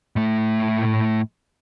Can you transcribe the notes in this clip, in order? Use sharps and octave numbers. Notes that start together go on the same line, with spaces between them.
A2 A3